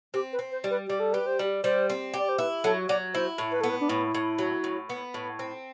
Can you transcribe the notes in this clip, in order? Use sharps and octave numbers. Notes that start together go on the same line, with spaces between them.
C4 G4
B4
C4
C5
G3
B4
G3 G4
A4
G4 B4
C5
G3
G3 C5
C4
G4
D5
C5
E4 B4
F#3 A4
F#3 D5
E4 C5
A2
B4
B3 A4
B4
D4
A2 E4
A2
F#3
A2
B3
A2
C4